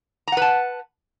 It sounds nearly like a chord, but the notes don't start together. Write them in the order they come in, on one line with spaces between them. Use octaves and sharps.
A#5 F#5 B4 A5